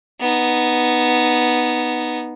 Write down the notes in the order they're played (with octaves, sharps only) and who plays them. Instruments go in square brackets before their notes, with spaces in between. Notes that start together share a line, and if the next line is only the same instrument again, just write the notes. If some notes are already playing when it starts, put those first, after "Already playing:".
[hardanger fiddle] B3 D#4